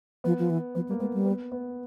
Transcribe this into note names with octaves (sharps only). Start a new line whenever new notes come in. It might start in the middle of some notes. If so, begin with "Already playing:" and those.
F3 B3
F3
E3
F3 B3
G3 A#3
G#3 B3
G3
B3
B3